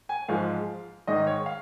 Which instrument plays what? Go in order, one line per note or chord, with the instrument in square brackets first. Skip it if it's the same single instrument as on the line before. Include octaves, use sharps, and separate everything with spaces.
[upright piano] G#5
G#2 F3 G#3 F5
G#2 D#3 G#3 D#5
C#5
F5